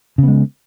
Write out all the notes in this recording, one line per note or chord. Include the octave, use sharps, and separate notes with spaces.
C#3 G#3 B3